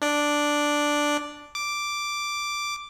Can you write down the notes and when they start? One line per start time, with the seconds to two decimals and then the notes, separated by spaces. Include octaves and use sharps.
0.02 D4 D5
1.55 D6